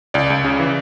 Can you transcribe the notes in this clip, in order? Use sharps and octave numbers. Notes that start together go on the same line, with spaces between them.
C#2 D5
C#2
C#3
E3